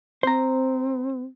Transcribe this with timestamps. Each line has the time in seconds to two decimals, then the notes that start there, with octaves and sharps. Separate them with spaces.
0.23 C4 C5 A#5